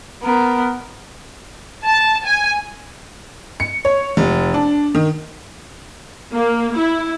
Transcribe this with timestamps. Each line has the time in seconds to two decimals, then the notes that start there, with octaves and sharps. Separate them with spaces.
0.22 B3 A#4
1.84 A5
2.26 G#5
3.60 C#7
3.85 C#5
4.17 F1
4.54 D4
4.95 D#3
6.33 A#3
6.76 E4